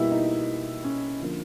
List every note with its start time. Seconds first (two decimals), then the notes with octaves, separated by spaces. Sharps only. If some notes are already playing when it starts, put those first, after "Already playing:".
Already playing: B2 G3 A#3 E4
0.11 D#4
0.84 C#4
1.20 D3 F3 A#3